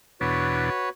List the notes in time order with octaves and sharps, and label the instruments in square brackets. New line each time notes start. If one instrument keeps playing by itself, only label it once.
[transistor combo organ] E2 B2 D4 [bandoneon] F#4 B4 C#5